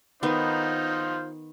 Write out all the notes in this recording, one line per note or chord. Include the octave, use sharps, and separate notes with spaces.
D#3 B3 D#4 F4 C5